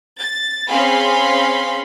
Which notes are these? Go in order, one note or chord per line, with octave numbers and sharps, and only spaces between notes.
A6
C4 C#4 G#4 F5 B5 C6